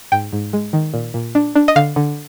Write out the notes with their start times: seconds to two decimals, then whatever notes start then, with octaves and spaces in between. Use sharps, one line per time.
0.12 G#2 G5
0.32 G#2
0.53 G#3
0.73 D#3
0.94 A#2
1.14 A#2
1.35 D4
1.56 D4
1.68 D#5
1.76 D3 F5
1.96 D3